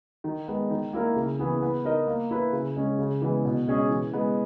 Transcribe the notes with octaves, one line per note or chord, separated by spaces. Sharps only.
D#3
G#3 B3
D#3
A#3 E4 A#4
C#3
E3 B3 E4 G#4
B3
D#4 A#4 D#5
A#3
E4 B4
C#3
G#3 C#4
C#3
E3 G#3 B3
B2
G#3 C#4 G#4 D#5
E3
G#3 B3